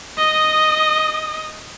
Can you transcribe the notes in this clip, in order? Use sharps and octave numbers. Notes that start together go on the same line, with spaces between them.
D#5 D#6